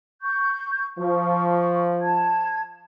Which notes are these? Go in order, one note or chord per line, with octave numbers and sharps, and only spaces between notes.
C#6 G6
F3 C#6
A5 G#6